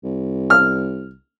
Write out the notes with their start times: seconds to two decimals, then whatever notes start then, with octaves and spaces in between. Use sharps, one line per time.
0.04 C2
0.50 F6